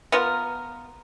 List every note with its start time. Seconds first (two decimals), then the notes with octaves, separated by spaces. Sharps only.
0.12 B3 F4 A#4